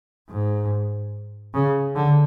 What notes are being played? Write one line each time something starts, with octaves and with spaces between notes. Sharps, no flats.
G#2
C#3
D3